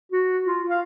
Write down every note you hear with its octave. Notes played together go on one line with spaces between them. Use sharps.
F#4
F4
F5